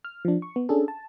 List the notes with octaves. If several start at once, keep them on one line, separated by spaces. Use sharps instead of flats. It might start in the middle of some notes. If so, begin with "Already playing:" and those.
F6
F3 D4
C#6
B3
C#4 D4 G#4 A4
A5